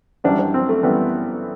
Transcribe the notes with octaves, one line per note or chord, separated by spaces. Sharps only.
F#2 E3 G3 D4
D4
C4
A3
F#2 E3 G3 B3